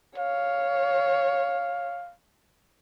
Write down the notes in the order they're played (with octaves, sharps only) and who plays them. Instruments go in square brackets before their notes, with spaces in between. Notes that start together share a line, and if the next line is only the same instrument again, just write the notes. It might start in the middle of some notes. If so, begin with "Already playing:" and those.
[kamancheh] C#5 [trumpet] F5